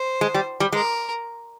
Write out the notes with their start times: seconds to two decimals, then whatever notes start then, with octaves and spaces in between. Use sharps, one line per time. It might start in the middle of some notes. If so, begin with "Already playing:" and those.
Already playing: C5
0.21 G#3
0.34 G3
0.60 G3
0.72 G#3 A#4